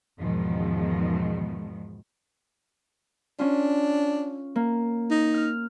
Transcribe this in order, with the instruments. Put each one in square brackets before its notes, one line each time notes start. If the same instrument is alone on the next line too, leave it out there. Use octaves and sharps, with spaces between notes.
[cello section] E2 G#2 B2 D#3 F3
[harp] C#4 F4 [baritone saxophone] D4
[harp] A#3
[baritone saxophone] D#4
[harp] F6